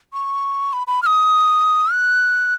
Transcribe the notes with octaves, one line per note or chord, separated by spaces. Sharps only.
C#6
B5
B5
F6
D#6
F#6